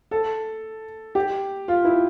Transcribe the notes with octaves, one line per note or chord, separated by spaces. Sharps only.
A4
G4
F4
E4